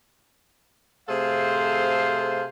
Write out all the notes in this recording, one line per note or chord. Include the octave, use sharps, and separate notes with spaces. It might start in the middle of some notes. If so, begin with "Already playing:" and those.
C3 A3 G#4 A4 C5 F5